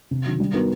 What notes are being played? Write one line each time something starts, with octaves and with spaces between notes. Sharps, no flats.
C3
D#3 F#3
G3
B3 D#4 F#4 A#4